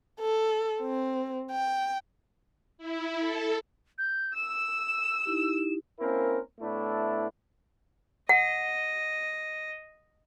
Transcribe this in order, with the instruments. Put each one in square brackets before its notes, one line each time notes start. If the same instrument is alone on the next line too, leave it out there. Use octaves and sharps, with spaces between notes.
[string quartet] A4
C4
G5
[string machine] E4
A4
[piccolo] G6
[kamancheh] E6 [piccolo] E7
[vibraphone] D#4 E4 G4
[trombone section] A#3 C4 C#4 E4 A#4 C5
A2 A3 B3 D4 E4
[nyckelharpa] D#5 [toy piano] F#5